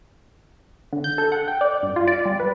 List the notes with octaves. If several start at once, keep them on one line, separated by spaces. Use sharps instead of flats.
D3
G6
A4
F#5
G5
D5
G2
F4
D5
G3
B4